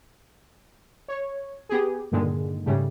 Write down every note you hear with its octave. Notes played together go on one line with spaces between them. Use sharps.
C#5
B3 G4 G#4
G2 A#2 D3 D#3 G#3
G#2 C#3 G3 A3